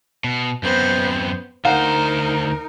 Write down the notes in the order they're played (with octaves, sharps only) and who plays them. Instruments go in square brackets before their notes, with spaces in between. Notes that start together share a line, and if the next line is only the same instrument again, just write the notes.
[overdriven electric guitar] B2
[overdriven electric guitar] F#2 C4 [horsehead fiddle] B3 C5
[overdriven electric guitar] D2 C5 [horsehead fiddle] D#4 A#4 [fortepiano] F5 F#5 A#5